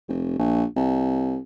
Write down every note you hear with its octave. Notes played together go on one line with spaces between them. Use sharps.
F1
A#1
C2